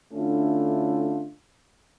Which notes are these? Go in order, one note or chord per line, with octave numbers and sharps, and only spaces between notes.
D3 A3 C#4 D4 E4 F4